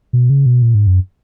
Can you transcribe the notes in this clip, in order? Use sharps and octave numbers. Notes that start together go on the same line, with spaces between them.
B2
C#3
B2
A#2
G#2
F#2